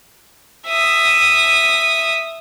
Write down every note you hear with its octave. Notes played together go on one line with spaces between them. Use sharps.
E5 D#6